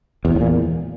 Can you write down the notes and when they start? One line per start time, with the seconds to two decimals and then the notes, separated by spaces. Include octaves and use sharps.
0.25 E2
0.30 C3
0.35 A2
0.41 A#2
0.46 E2